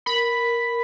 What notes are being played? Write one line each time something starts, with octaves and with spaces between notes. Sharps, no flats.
A#4 B5